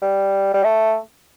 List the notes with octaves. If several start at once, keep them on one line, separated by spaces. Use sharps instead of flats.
G3
G3
A3